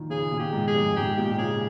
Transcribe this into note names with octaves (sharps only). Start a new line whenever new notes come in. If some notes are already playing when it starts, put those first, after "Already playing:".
Already playing: A#2 D#3 F3
C#3 G#4
A#2
G4
G#2
G#4
F2
G#2 G4
A#2 G4
C#3 G#4